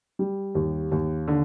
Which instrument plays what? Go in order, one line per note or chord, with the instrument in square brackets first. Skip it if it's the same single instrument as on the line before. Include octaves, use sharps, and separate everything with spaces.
[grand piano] G3
D#2
D#2
D3